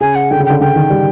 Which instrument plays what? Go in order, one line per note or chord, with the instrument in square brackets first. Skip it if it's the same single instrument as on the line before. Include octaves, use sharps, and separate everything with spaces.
[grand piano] C#3 [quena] G#5
[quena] F#5
[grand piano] D3 [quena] G5
[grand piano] C#3
[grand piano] D3 [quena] G5
[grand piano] D3 [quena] G5
[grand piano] D#3
G3